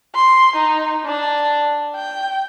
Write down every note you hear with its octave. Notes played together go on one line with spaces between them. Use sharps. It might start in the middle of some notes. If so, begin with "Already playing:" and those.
C6
D#4
D4
G5